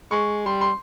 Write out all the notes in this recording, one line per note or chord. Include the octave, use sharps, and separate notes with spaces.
G#3 C#6
G3 C6
C6